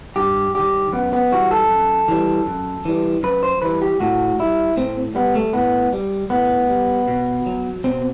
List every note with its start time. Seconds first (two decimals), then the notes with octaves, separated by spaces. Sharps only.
0.16 G2 G4
0.55 D#3 G3 G4
0.93 F#2 B3
1.13 B3
1.31 E3 G3 F#4
1.51 A4
1.70 F#2
2.08 E3 G3
2.46 F#2
2.85 E3 G3
3.23 F#2 B4
3.43 C5
3.62 E3 G3 B4
3.82 G4
4.00 A2 F#4
4.39 G3 E4
4.77 A2 C4
5.15 G3 B3
5.35 A3
5.53 A2 B3
5.93 G3
6.30 A2 B3
6.69 G3
7.08 B2
7.46 F#3
7.84 B2 C4